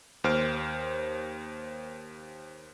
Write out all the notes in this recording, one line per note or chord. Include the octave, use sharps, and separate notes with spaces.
D#2 C5 F6 D7